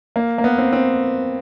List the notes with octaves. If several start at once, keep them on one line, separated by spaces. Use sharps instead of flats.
A#3
A#3
B3
C4
C4